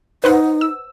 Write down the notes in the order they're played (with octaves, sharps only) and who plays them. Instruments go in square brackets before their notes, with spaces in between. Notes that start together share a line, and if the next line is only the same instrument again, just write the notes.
[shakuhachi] D#4 [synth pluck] B4 C5 F#5
[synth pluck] E6